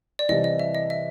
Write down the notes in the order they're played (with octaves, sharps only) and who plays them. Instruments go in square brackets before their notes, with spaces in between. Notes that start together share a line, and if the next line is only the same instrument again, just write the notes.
[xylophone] D5
[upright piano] C2 C3 E3 [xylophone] D#5
[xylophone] D#5
E5
D#5
E5